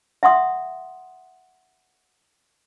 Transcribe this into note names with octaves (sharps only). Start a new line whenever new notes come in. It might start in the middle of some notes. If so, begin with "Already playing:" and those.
E5 F#5 C6 D#6